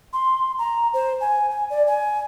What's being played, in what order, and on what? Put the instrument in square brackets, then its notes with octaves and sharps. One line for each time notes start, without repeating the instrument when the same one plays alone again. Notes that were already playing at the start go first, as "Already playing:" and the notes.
[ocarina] C6
A#5
C5
G#5
G#5
D5
G#5